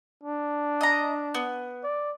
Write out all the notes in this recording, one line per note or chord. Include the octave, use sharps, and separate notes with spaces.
D4
D#5 A#5
B3
D5